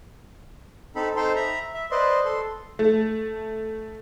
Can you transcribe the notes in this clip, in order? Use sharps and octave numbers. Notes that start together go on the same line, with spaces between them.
C4 D#4 A4 B5
D#4 A4 C5 G5 C6
E5 A#5 B5
E5
B4 C5 D5 D#5 C6
A4 C6
A3